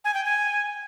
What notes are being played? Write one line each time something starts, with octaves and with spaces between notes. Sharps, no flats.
G#5
G5
G#5